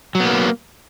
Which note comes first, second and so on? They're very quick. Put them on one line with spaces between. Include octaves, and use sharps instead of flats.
F#3 B3 A#3